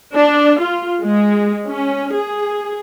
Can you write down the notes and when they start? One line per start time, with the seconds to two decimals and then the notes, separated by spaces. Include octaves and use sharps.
0.14 D4
0.60 F4
1.02 G#3
1.67 C#4
2.14 G#4